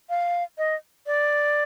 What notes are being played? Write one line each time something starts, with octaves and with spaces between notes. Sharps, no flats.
F5
D#5
D5